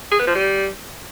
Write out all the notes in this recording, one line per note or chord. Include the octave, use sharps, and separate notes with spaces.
G#4
B3
F3
G3